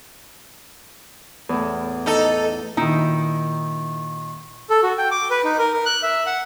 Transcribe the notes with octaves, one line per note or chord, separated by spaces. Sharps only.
E2 A2
D#4 A4
A#2 D#3 D#4 E4
A4
F#4
G5
D6
B4
D#4
A#4
A#4
F#6
E5
F#5